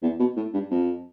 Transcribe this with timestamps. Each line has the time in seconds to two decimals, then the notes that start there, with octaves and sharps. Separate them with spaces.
0.03 E2
0.19 B2
0.37 A2
0.54 G2
0.71 F2